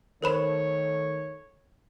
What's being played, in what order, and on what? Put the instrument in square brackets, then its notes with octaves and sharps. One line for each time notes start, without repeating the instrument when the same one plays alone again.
[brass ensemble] D#3 A3 C#5 [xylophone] A#4 C5 B5